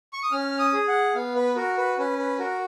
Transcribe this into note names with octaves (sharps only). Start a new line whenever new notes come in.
C#6
D#6
C#4 F6
D#6
G#4
F#5
B3 F5
B4
F#4 A#4
B4
C#4 B4
B4
F#4 A#4